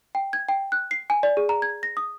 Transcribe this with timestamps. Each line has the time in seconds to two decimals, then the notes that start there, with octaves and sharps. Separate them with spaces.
0.15 G5
0.33 G#6
0.49 G5
0.72 F#6
0.91 C7
1.10 G#5
1.23 D5
1.37 G#4
1.49 A#5
1.62 G#6
1.83 A#6
1.97 D#6